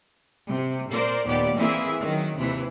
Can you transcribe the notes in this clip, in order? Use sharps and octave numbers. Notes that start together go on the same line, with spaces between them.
C3
A#2 A#4 C5 D5
D#2 A#2 B3 G4 D5
E3 A#3 C4 E4 G#4 E5
D#3 F#3
D#2 C3 E3